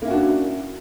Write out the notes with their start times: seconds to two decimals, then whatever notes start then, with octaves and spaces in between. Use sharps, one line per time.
0.02 A#3
0.05 E4
0.08 C#4
0.10 F#4
0.13 D4